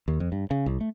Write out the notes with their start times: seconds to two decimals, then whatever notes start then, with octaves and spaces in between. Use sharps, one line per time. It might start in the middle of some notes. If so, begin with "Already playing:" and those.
0.08 D#2
0.20 F2
0.32 G2
0.51 C#3
0.66 C2
0.81 A3